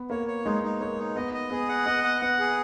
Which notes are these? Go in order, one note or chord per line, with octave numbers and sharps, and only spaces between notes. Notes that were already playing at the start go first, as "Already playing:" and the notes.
Already playing: B3
A#3 C#5
C#5
G#3 D#4
D#4
A#3 C#5
D#4
B3 D#5
D#5
B3 G#4
F#5
B3 D#5
F#5
B3 F#5
G#4